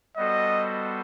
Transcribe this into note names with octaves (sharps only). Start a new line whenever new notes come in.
G3 B3 F#4 A4 C5 D#5